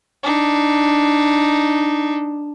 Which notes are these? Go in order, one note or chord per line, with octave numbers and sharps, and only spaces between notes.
D4 D#4